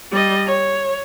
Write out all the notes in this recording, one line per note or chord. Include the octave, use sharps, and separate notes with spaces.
G3 D#5
C#5